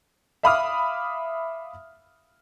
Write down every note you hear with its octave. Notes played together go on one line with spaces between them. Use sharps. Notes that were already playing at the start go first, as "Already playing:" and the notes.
E5 F5 B5 D6 D#6 F6